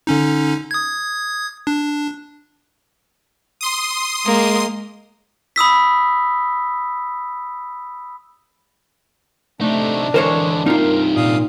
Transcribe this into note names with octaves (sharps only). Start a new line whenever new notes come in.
D3 C#4 D#4
D#6 G#6
D4
C6 D#6
G#3 A#3
B5 D#6 E6 B6
C3 A3 D4 D#4
D3 E3 G#3 A#4 C5 C#5
G2 C3 D#4 F4 A#4
A#2 F5 D#6